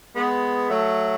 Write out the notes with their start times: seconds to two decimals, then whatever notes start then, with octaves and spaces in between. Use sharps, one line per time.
0.15 G#3 B3
0.70 F#3 A3